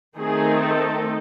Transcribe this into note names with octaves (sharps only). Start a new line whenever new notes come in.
D#3 A3 C4 D#4 G#4
A4